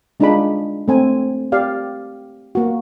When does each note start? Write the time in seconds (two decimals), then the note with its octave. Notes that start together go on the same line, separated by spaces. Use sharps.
0.20 G#3 D4 D#4 F4 G#4 B5
0.88 A3 C4 G#5
1.52 G4 D5 F5
2.55 A#3 F#4